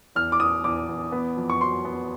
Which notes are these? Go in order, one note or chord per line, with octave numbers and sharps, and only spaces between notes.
E2 F6
D6
E2 D#6
E2 D6
E2
B3
F2
C#6
F#3 C6
B3